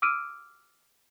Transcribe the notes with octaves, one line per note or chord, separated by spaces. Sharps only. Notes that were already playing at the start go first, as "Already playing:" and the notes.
D6 E6 F6 D7 D#7